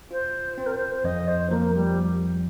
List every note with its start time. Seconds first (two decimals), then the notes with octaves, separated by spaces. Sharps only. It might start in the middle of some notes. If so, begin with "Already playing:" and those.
0.11 F4 C5
0.58 C4 C5
0.66 A#4
0.74 C5
0.95 C5
1.04 F2 D#5
1.28 C5
1.50 F3 A#3
1.75 G3